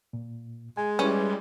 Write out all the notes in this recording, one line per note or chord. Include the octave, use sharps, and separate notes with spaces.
A#2
G#3 G#5
G3 C#4 E4 B4